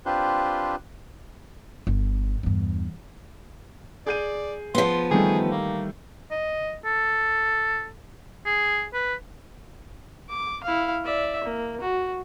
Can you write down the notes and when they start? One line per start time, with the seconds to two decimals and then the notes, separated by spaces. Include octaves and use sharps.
0.06 C4 D4 F4 G4 B4 C5
1.87 G1
2.43 E2 G2
4.06 G#4 D5 G6 D#7
4.75 F3 B3 C6
5.11 D#3 E3 G3 A3 G#4
5.51 A#3
6.31 D#5
6.85 A4
8.46 G#4
8.94 B4
10.29 D6
10.63 E4 F5
11.05 D5 E5
11.44 A#3
11.80 F#4